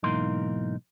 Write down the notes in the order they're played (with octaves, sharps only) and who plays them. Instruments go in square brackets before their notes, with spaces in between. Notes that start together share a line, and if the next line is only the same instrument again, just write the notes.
[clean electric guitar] B1 G#2 E3 A#3 D#4 C6